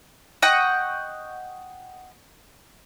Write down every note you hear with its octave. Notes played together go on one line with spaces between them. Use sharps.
D#5 F#5 G5 C#6